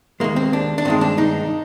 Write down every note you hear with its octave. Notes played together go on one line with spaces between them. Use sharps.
D#2 D#3 G#3 A#3
C4
D4
D4
G2 D#3 G#3 C4
D4
D#4